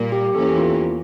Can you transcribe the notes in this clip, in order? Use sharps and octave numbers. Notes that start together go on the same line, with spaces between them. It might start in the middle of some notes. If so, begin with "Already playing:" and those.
Already playing: A#2 G3 A#3
G4
E2 E3 A#3 C#4 A4
G4
F4